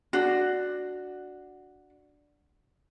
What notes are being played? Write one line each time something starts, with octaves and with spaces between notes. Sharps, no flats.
D4 F#4